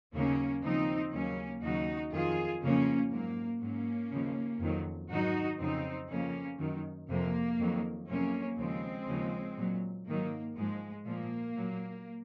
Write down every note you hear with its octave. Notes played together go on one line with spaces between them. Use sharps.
D#2 C#3 F#3 A#3 C#4
D#2 C#3 F3 C4 D#4
D#2 C#3 F#3 A#3 C#4
D#2 C#3 F#3 D#4 F#4
F2 D#3 F#3 F4 G#4
F2 C#3 F3 A#3 C#4
G#2 F#3 A#3
G#2 F#3 A#3 C#4
D#2 C#3 F3
F2 D#3 F#3
G#2 D#3 F#3 D#4 F#4
F2 C#3 F#3 C4 D#4
F2 C#3 F3 A#3 C#4
F#2 D#3 F#3
F2 C3 F3 A#3
F2 D#3 F#3
F2 C3 F#3 A#3 C#4
D#2 C#3 F3 G#3 C4
D#2 C#3 F3
A#2 F#3
G#2 D#3 F#3 A#3
G#2 F3 G#3
A#2 F3 A#3
A#2 F#3